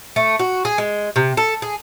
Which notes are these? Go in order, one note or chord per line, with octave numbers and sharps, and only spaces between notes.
A3
F#4
G#4
G#3
C3
A4
G#4